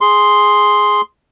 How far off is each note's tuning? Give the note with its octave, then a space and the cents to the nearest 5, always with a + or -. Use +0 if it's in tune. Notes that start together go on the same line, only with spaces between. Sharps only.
G#4 +0 C6 +0